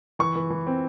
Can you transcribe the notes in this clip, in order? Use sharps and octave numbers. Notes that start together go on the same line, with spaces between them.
E3 C#6
E3
E3
C4